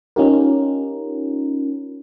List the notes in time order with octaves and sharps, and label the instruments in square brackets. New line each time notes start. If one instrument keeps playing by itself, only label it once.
[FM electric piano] C#4 D#4 F4 G4 A#4